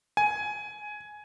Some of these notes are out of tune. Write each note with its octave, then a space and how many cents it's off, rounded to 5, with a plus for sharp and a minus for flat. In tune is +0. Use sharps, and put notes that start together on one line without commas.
G#5 +10